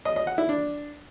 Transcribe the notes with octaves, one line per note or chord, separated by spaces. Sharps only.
D#5
D#5
F#5
E4
D4